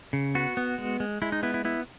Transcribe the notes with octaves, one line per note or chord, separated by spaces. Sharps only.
C#3
B3 F#4
B3
G#3
G#3
G#3 E4
D#4
B3 E4
E4
B3 E4